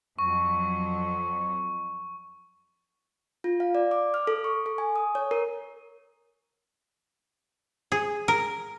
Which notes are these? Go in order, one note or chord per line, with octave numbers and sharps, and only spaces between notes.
F2 F#3 C4 C#6
F4
F5
D5
D6
F6
A4
C#6
A4
G#5
D#6
C#5
A#4
G#4
A#4